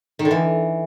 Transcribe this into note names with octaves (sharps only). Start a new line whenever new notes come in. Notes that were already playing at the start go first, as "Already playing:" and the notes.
D#3
D3
E3